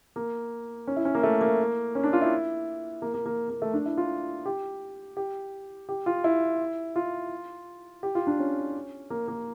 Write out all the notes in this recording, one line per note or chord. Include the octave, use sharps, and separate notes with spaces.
A#3
C#4
E4
C#4
A#3
A3
A#3
C#4
D4
F4
E4
A#3
A#3
A#3
A#3
A3
D4
E4
F4
G4
G4
G4
F4
E4
F4
G4
F4
D4
C#4
A#3
A#3